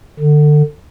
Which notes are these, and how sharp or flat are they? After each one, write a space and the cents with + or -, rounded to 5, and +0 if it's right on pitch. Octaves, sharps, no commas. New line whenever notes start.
D3 +25